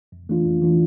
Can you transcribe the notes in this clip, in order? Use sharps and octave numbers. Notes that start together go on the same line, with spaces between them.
F2
E3 A3 D4 F4
F2
E3 A3 D4 F4